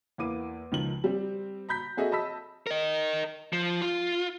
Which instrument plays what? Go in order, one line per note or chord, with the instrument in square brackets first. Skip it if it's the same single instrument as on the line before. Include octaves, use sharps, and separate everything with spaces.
[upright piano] E2 A#3 E4 D6 D#7
C#2 D#3 F3 F#7
G3 C4
A#5 B5 G6 B6
C4 F#4 G#4 A4 D#5 E5
D#5 A5 B5 E6 B6
[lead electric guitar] A#4 D#5
F3
F4